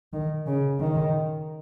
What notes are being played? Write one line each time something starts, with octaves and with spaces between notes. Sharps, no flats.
D#3
C#3
D#3